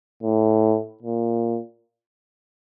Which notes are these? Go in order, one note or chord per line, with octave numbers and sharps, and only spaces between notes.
A2
A#2